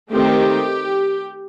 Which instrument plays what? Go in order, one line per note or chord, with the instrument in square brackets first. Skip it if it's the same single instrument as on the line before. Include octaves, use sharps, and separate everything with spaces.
[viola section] D#3 A3 C4 G4